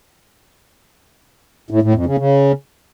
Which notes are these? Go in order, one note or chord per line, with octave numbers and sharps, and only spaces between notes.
A2
A2
F2
C#3
C#3